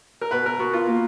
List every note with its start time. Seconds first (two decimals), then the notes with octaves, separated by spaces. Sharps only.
0.21 A#4
0.31 B2 B4
0.46 A#4
0.59 B3 F#4
0.73 F4
0.87 A#3